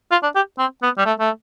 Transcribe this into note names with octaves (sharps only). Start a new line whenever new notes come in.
F4
D4
G4
C4
B3
G3
A3
A3